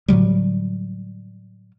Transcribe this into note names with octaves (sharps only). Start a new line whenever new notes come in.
A2 D3 F#3 G3